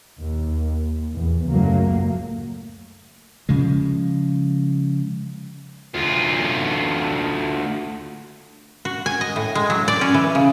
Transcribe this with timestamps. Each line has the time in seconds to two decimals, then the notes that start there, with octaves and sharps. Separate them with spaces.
0.20 D#2
1.13 E2
1.47 F#1 C#2 A2 F#3 A3 A#3
3.49 C#3 F3 G#3
5.94 D2 F4
8.85 F#4
9.06 G#5
9.21 D#5
9.36 A2
9.55 G#3
9.70 F#3
9.88 D5
10.01 C#4
10.14 E3
10.35 C#3